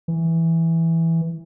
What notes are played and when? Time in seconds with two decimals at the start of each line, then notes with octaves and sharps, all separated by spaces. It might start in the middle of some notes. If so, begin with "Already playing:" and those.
0.08 E3